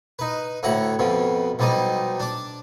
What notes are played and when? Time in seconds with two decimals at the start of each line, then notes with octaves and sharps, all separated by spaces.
0.19 D#4 B4
0.63 D2 A2 F#5 A#5 B5
0.99 F2 B2 F3
1.59 B1 F3 G3 D#4 D#5
2.20 D4 D6